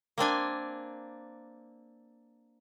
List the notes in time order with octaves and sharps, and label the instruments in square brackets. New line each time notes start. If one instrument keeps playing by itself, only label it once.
[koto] A#3 C4 D4 G#5